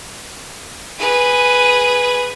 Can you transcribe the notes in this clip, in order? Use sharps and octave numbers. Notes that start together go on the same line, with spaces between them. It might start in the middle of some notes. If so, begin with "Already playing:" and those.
G#4 B4